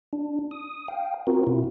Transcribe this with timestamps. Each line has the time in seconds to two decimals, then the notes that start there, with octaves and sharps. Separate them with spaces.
0.13 D4
0.51 D#6
0.88 F5 G5
1.27 C4 F4 F#4 A#4
1.47 B2 E4